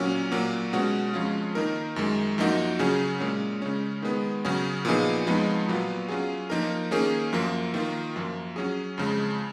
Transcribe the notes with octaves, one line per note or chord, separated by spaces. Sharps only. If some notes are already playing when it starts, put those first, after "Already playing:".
Already playing: A#2 F#3 C#4
A#2 F#3 A#3
B2 G#3 C#4 F#4
F2 F3 G#3 C#4 F4
D#3 A#3 D#4 A#4
F#2 D#3 G#3
F#2 F3 A#3 D#4 F#4
C#3 F#3 C#4 G#4
A#2 G#3 C#4
C#3 G#3 C#4
D#3 G#3 B3
C#3 F#3 C#4 G#4
A#2 F3 B3 D#4 G#4
F2 F3 G#3 B3 D#4
A#2 F#3 B3 F4
F#3 C#4 F4 G#4
F3 A#3 D#4 A#4
D#3 A#3 C#4 G#4
F#2 F3 A#3
D#3 A#3 F4 A#4
F#2 F3 A#3
F#3 C#4 G#4
F2 C#3 G#3